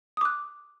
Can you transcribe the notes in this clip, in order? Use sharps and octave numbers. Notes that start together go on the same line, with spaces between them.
D6 D#6 F#6